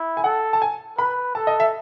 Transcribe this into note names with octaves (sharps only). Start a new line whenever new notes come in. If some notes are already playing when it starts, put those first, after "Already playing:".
Already playing: E4
G#5
A4 F#5
A5
G#5
B4 B5
A4 A5
D#5
E5